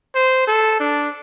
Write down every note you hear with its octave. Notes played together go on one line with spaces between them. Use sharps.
C5
A4
D4